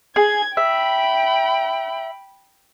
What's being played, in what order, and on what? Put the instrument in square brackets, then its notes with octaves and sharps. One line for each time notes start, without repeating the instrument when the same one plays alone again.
[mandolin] G#4 [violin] G#6
[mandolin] E5 [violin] G5 B5